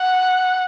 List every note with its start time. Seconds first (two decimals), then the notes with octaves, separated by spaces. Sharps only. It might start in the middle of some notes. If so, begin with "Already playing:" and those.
Already playing: F#5